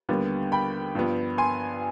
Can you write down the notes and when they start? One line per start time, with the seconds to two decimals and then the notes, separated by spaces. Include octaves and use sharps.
0.09 D#2 D3 G3 B3
0.52 G5 B5
0.95 G2 F3 B3
1.38 G#5 C6